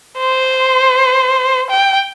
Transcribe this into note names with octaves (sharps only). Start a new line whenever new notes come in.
C5
G5